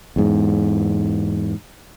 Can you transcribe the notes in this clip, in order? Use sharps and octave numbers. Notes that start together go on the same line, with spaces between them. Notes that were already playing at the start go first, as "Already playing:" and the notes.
E2 G#2